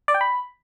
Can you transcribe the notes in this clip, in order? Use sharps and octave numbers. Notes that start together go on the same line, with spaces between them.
D5
G5
B5